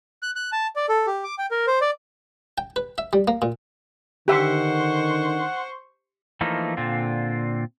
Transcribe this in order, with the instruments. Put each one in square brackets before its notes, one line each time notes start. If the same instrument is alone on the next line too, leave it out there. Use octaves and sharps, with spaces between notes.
[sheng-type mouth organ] F#6
F#6
A5
D5
A4
G4
D6
G5
A#4
C5
D5
[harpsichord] G5
B4
E5
G3
A#3
A#2
[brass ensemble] D3 D#3 [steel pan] G4 E5 [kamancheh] C5 C#6 [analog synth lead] F#5
[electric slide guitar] E3 F3 A3 A#3 D#4
A#2 D3 C4 F4